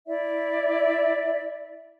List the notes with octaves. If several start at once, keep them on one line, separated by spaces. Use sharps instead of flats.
E4 D5 E5